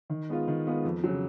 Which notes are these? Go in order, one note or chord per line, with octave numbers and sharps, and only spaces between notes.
D#3
G#3 B3 F4
D#3
G#3 B3 F4
F2
C#3 F#3